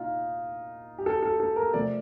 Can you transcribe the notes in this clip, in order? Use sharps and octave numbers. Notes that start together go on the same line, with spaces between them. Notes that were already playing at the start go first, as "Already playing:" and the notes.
Already playing: A#2 D#4 F4
G4
A4
A4
A4
A#4
C3 F3 A3 D5